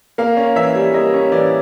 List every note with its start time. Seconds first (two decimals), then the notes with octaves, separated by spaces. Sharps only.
0.18 A#3 F5
0.37 C#4
0.56 E3 E5
0.75 G3
0.94 A#3 D#5
1.14 C#4
1.32 E3 D5